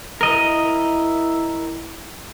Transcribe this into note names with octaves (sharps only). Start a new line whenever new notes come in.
E4 A#4 D#5